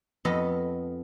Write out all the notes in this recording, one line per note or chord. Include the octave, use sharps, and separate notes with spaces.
F2 B3 A4 D#5